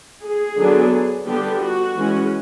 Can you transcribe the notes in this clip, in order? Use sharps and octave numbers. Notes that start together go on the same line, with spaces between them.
G#4
D3 F#3 B3 D4
D3 G3 B3 D4 G4
F#4
E3 G#3 C#4